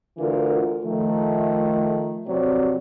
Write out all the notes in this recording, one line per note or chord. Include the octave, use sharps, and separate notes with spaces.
D2 D3 E3 F4 A#4
D#3 F3 A3
F2 C3 F#3 C4 D5